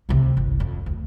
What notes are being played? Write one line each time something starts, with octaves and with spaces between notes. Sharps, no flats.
D2 C3
G1 C2
F2
D2